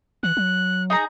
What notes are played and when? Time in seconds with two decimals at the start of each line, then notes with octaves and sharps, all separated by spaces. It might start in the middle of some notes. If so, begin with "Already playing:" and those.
0.23 E3 F#6
0.37 F#3
0.90 D#4 G#4 A#5